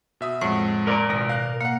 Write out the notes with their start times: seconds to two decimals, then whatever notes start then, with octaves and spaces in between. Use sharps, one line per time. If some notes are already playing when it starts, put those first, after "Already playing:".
0.21 B2 E5 D#6
0.41 F2 A2 G#3 C#5 F#5
0.87 A#4 D5
1.09 G#1 B2 A#6
1.29 F5 F#6
1.61 A#3 F5 F#5